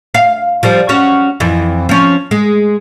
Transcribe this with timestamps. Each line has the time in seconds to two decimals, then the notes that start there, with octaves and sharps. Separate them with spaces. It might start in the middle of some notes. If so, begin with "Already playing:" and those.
0.14 F5
0.63 F3 G3 C5
0.89 C#4 F#4
1.40 F2 E3
1.89 F3 C#4
2.31 G#3